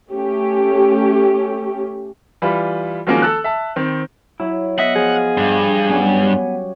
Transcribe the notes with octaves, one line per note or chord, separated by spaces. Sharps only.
A3 C#4 G4
E3 G3 F4 B5
D#3 F3 F#3 G#3 A#3 C#4
A4 E6 F#6
E5 A5
D#3 C4
F#3 E4
B3 D#5 E5 F#5
F3 G#4 F5
G2
F#3 G3 B3 C#4 G#5